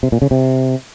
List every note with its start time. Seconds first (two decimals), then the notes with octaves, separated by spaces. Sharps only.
0.03 C3
0.12 A#2
0.22 C#3
0.31 C3